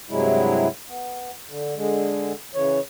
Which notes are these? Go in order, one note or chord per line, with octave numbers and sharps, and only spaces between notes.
G2 C3 F#3 G#3 E4
B3
D3
D3 G#3
C#3 E3 C#5